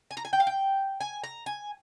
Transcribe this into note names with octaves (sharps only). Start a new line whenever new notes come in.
G#5
A#5
G#5
G5
F5
G5
G#5
A#5
G#5